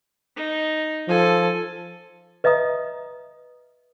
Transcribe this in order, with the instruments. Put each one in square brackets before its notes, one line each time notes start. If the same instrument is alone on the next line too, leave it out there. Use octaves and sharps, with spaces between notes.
[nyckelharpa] D#4
[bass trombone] F3 [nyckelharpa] A4 G#5
[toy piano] B4 D#5 E5 A#5 D#6